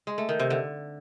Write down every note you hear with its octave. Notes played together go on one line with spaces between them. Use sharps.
G#3
A3
D#3
C3
D3